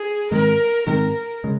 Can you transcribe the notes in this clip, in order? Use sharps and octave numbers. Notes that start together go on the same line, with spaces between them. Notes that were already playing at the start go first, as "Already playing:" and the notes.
Already playing: G#4
G#2 D#3 G#3 C4 A#4
G#2 D#3 G#3 C4 A#4
C#3 G#3